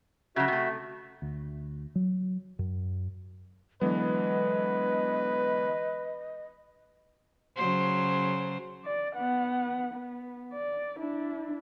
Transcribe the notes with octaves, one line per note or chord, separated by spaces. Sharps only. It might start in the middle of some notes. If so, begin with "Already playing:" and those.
C#3 F#3 F#4 E5
C3 A3
D2
F#3
F#2
D3 E3 F#3 G#3 B3 B4 D#5
C#3 F#3 C5
D5
B3 F#5
B3
D5
D4 E4